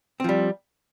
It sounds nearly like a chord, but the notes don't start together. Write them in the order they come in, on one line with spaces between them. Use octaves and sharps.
C4 F3 G3